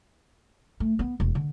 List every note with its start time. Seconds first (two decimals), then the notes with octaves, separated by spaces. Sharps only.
0.80 A3
0.99 B3
1.20 E1
1.35 D3